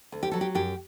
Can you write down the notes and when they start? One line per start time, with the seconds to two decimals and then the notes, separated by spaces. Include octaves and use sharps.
0.12 D2
0.23 G4
0.31 F#3 A4
0.41 G4
0.55 F#2 G4